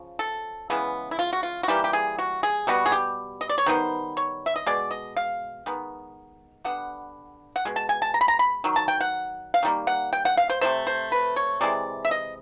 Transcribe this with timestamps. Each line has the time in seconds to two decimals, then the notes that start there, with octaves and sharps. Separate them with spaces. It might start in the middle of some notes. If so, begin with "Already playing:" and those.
Already playing: C#3 F3
0.19 A4
0.70 C#3 E3 G#3 B3
1.11 E4
1.19 F4
1.33 F#4
1.43 F4
1.63 F#4
1.68 E3 G3 A#3 G4
1.84 G4
1.93 G#4
2.19 F#4
2.43 G#4
2.67 B2 G3 B3 F#4
2.86 G#4
2.92 G4
3.41 D#5
3.49 D5
3.58 C#5
3.66 D#3 G3 B3 C5
4.17 C#5
4.46 E5
4.56 D#5
4.66 B2 G#3 D5
4.91 D#5
5.17 F5
5.66 D#3 G#3 B3
6.65 D3 G3 B3 F#5
7.56 F#5
7.65 B2 G#3
7.76 A5
7.89 G#5
8.02 A5
8.14 A#5
8.21 B5
8.28 A#5
8.39 B5
8.64 D#3 F#3
8.76 A5
8.88 G5
9.01 F#5
9.54 F5
9.63 D#3 G3 A#3
9.87 F#5
10.13 G5
10.25 F#5
10.37 F5
10.50 C5
10.61 C3 F3 A3 C5
10.87 C5
11.12 B4
11.36 C#5
11.61 C3 E3 G#3 D5
12.05 E5
12.11 D#5